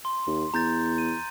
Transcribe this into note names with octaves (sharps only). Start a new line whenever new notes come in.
C6
D#2
E2 A#5 G6 A6
D#7